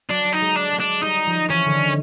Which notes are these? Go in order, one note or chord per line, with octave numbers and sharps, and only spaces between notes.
F#3 D4
D#4
G#3
D4
G#3
D4
G3 D#4
F3
E3 C#4
D3
D#3